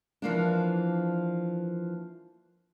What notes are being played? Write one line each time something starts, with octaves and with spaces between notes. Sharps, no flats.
E3 F3 A#3 D4